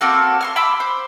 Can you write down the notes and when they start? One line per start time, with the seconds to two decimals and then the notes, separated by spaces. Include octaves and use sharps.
0.01 A#3 C4 F#4 A4
0.41 C6 C#6 F6
0.56 B5 D6 E6
0.80 C5